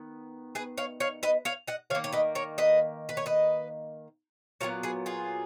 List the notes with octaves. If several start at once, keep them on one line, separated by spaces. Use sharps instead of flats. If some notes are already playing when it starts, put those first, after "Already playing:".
Already playing: D#3 B3
G#4 B4
C#5 F5
C#5 F5
B4 D#5
C#5 F5
D#5 F#5
D#3 A#3 C#5 F5
C#5
B4 D#5
A#4 C#5
B4 D#5
B4
C#5
B4 D#5
A#2 F#3 B3 C#5 F5
G#4 B4
F4 G#4